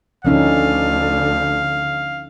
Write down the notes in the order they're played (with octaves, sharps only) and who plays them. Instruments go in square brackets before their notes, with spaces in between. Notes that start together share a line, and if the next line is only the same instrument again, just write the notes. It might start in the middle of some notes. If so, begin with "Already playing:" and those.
[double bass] D2 D3 [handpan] F3 C#4 D#4 [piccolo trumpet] F5